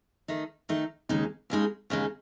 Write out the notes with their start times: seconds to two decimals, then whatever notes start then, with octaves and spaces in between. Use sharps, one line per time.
0.28 D#3 A3 D#4
0.69 D#3 A3 D#4
1.09 D#2 C#3 G#3 D#4
1.50 D#2 C#3 G#3 D#4
1.90 D#2 C#3 G#3 D#4